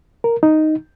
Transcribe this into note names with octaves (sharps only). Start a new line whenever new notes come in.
A#4
D#4